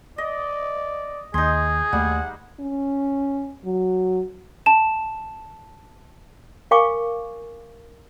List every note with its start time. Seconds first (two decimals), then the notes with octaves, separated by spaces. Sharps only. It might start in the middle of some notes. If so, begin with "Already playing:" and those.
0.18 D5 D#5
1.34 D#2 D#4 G#4 C6
1.93 D#2 G3 A3 F#5
2.60 C#4
3.65 F#3
4.66 A5 E7
6.71 A#4 F5 G#5 C#6 D6